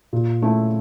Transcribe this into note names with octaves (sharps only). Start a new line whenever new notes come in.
A#2
A3 C#4 E4